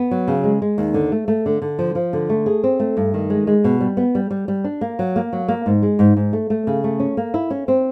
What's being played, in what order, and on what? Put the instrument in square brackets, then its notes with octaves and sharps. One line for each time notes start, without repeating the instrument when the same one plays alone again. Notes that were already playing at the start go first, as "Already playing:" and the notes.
Already playing: [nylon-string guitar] B3
F#3
C#3
G#3
G#3
D#2
D3
A3
A3
D3
D3
F3
F3
D3
A3
G#4
C4
A3
G2
D#3
G#3
G#3
B2
G3
B3
G3
G3
G3
D4
A#3
F#3
A#3
F#3
A#3
G#2
G#3
G#2
G#2
A3
A3
C#3
A3
C#4
A#3
E4
C#4
C4